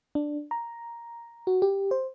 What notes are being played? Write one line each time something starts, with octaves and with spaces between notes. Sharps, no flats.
D4
A#5
F#4
G4
C5